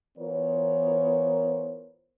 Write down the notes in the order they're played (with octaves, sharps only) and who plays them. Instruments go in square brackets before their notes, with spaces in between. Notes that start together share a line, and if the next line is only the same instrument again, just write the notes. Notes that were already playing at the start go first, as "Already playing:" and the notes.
[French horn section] E3 B3 F4 A#4 C5 C#5